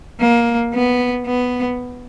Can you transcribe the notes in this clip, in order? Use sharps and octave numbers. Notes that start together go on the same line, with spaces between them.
A#3
B3
B3